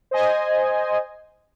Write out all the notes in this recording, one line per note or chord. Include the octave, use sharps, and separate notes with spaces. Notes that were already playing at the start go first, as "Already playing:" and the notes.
C5 D#5 G#5